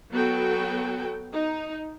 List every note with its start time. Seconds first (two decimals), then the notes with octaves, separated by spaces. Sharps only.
0.12 F#3 B3 F#4 A4 G5
1.32 D#4